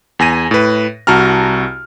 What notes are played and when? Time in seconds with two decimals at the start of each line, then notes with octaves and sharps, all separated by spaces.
0.19 E2 G#5 A#6 D#7
0.51 A2 B4
1.07 C2 F#4 A5 A#5 F6